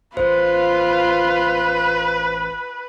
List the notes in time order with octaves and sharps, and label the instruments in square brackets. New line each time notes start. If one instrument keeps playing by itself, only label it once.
[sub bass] A1 [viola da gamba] F4 [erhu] B4 [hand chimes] C5